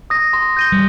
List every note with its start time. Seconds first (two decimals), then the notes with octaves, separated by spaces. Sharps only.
0.10 D#6 A#6
0.33 C6
0.57 G6 A#6 D#7 G7
0.72 G3